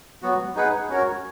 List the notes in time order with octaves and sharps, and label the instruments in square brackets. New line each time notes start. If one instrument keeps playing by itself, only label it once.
[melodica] F#3 B3 F#4
D#4 G#4 B4 F#5
C#4 F#4 A#4 C#5